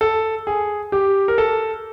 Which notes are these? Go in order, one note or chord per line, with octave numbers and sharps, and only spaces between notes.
A4
G#4
G4
A#4
A4